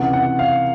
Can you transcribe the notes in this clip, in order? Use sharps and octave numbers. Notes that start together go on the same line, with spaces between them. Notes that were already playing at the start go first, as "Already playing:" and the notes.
Already playing: C#2 C3 E3 F#5
F#5
F5